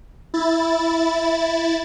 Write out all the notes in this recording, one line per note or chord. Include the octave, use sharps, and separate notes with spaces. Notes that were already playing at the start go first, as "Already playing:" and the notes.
E4 A6